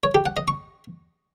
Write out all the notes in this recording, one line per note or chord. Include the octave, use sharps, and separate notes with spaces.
C#5
G4
F#5
D#5
C#6